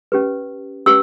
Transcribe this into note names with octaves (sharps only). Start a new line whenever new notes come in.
C#4 G4 B4
C#4 G4 B4 E6